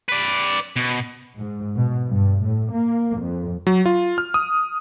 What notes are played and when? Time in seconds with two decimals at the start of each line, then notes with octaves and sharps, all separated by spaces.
0.08 B4 D5
0.76 B2
1.38 G#2
1.75 B2
2.07 G2
2.41 A2
2.71 A#3
3.18 F2
3.67 F#3
3.86 F4
4.18 F6
4.34 D#6